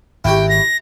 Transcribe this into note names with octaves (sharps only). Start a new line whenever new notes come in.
G#1 E4 F#4 G4 G5
A#6